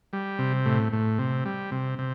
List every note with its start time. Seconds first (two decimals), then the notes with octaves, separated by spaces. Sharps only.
0.13 G3
0.39 C3
0.65 A2
0.93 A2
1.19 C3
1.45 G3
1.72 C3
1.99 C3